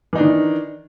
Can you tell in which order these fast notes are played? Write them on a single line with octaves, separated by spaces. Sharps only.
E3 D#4 D4 D#3